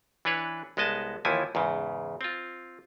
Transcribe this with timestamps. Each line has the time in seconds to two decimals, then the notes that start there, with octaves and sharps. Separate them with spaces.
0.25 E3 D4 B4 C#5
0.77 C2 G#3 B3 D#5 A5
1.25 D#2 E3 F3 E4 G#5
1.55 E2 G#2 C#3
2.21 C4 F4